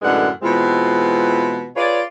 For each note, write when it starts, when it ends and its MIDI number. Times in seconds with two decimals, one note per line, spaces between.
0.02 0.28 42
0.02 0.28 45
0.02 0.28 50
0.02 0.28 56
0.02 0.28 71
0.02 0.28 78
0.42 1.68 47
0.42 1.68 52
0.42 1.68 56
0.42 1.68 60
0.42 1.68 65
1.75 2.00 65
1.75 2.00 68
1.75 2.00 71
1.75 2.00 73
1.75 2.00 74